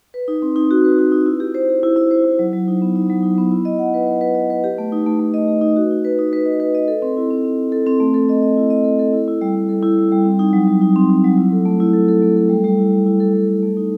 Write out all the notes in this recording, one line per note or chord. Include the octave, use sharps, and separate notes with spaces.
B4
D#4
C4
D#4
F#4
B4
D#4
D#4
E4
G4
C5
G4
E4
E4
C5
E4
F#3
F#3
D#4
B3
D#4
F#3
D#4
B3
E4
D#5
F#5
B4
B4
B4
D#5
B4
G4
A3
D#4
A3
A3
D#5
G4
D#4
F#4
D#4
B4
D#4
B4
D#5
B4
D#5
A4
C4
E4
C4
C4
E4
A4
C4
A3
A4
D#5
D#5
E4
D#5
A4
A4
E4
E4
G3
G3
A4
E4
G3
G3
C4
D#4
F#3
F#3
D#4
C4
C4
F#3
E4
A4
A3
E4
A4
A4
A3
A4
G3
G3
E4
E4
E4
A4
G3
A4
A3
D#4